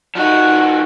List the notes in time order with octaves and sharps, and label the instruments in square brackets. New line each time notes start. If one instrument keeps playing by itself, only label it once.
[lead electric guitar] F3 D#4 [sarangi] F#4